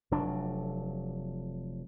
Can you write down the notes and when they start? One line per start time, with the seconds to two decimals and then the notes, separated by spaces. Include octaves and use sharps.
0.11 F1 F#3 D4